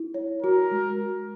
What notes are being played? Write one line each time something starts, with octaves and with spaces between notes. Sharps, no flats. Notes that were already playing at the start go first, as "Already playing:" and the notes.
Already playing: E4
C#5
F#4 A#4
G#3
F#4